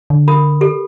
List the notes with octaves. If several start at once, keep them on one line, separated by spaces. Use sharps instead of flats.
D3
A#4 B5 D#6
G4 A4